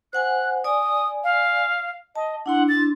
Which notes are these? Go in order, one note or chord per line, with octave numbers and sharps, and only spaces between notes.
C5 F#5 G#5 F#6
D5 G#5 D#6
F5
D#5 A5
D4 E4 F#5 C6
A6